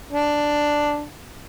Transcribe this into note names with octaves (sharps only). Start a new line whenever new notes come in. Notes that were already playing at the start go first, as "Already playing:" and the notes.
D4